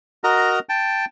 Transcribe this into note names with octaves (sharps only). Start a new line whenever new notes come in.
F#4 A#4 D#5 A#5
G5 A5